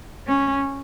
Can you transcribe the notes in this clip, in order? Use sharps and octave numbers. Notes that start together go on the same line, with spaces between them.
C#4